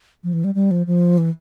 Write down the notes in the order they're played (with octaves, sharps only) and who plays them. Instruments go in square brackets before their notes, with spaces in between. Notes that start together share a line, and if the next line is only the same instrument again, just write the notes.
[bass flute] F3
E3
G3
G3
F3
F3
E3